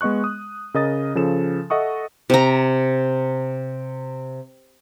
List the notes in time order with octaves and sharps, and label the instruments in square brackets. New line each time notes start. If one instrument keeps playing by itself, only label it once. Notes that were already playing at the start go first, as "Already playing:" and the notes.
[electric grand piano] G#3 B3 D#5 C#6 F#6
D#6
C#3 A#4 D#5 D#6 A6
C#3 F3 A4 E7
A4 D#5 E5 F#5 C#6 D#6
[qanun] C3 A#5